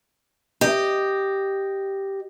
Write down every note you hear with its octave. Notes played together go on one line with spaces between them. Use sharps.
G4 D#5